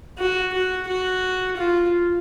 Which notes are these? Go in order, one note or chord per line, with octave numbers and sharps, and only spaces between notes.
F#4
F#4
F#4
F4